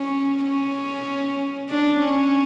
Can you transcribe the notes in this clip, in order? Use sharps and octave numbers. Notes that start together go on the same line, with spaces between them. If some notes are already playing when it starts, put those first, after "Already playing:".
Already playing: C#4
C#4
D4
C#4